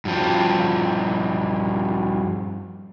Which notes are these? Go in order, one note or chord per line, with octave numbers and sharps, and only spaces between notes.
G2 F3